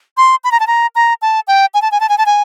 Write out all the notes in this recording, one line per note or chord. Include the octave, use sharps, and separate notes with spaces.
C6
B5
A#5
A5
A#5
A#5
A5
G5
G#5
A5
G#5
A5
G#5
A5
G#5